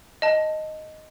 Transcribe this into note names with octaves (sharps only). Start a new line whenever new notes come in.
D#5 A5